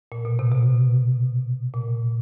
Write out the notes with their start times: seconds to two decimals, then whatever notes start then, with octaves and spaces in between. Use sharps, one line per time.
0.12 A#2
0.25 B2
0.39 C3
0.52 B2
1.74 A#2